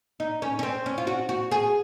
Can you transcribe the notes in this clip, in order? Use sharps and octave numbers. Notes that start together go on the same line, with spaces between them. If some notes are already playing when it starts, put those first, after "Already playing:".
D#4
C#4
C#4
C4
C#4
F4
F#4
F#4
G#4